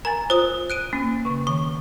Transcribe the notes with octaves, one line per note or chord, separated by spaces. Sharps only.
A#4 G#5 A#5 A6
F4 C5 D#6
F#6 D7 D#7
A#3 C#4
C#3 C#6
D#3 C#6